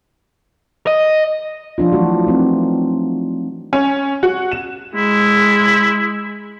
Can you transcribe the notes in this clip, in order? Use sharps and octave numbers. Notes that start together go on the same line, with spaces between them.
D#5
F3 D4 F4
E3 F#3 A3 F#4
A3 C4 D#4
C#4
F#4
E7
G#3 E4